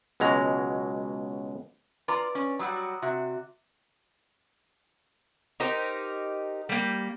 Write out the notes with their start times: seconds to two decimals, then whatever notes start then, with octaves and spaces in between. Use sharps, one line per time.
0.20 C#2 B2 F#3 G#3 A#5
2.08 F4 B4 D5 A#5
2.35 C#4
2.59 F#3 G3 F#4 A#5 D#6 E6
3.02 C3 F#4 E5
5.60 D#4 G4 A#4 C5
6.69 G3 A#3